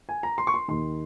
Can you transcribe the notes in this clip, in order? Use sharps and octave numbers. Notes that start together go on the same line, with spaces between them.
G#5
A#5
C6
C#6
C6
D#2 D#3 C6